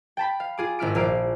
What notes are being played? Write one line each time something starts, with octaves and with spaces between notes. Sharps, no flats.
G5 A5 B5
F5
F4 G#4 D6
G#1 E4 F6 D7
A#1 A#3 F5 D7